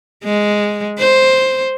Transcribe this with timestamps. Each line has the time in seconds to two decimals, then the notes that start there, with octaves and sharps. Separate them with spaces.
0.24 G#3
0.98 C5